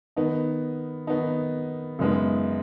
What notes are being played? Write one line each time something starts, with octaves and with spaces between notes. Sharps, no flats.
D#3 B3 D#4
D#3 B3 D#4
F#2 C#3 G#3 B3 D#4